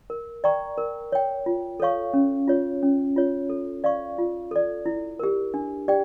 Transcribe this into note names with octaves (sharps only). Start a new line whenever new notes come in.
A#4
D5 G5 A#5 C#6
A#4
C#5 G5
F4
A4 C#5 F5 C#6
C#4
F4 C#5
C#4
F4 C#5
A4
D5 F5 C#6
F4
A4 D5
E4
G4 A#4
D4
G4 D5 G5